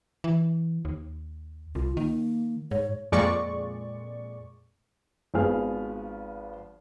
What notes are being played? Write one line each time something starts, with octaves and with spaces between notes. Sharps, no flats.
E3
D#2
C2 F4
D#3 A#3
G#2 C#5
F2 A#2 G#3 D5 C#6
G#1 F3 B3 G#4 F6